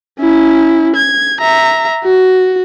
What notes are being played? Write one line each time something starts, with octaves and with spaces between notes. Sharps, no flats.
C#4 E4
G#6
E5 A#5
F#4